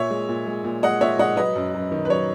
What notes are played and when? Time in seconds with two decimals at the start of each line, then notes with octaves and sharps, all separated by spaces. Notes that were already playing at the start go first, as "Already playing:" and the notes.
Already playing: A#2 C#5 E5
0.10 G#3
0.29 A#2
0.46 G#3
0.64 A#2
0.83 G#3 D#5 F#5
1.01 A#2 C#5 E5
1.19 G#3 D#5 F#5
1.37 F#3 B4 D#5
1.55 F#2
1.74 F#2
1.91 D#3
2.05 B4
2.10 F#3 C#5